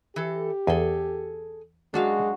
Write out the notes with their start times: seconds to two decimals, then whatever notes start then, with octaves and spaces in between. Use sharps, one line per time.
0.16 E3 G4 A4
0.67 E2 G#4 A4
1.94 F#2 G#3 D4 F#4 F5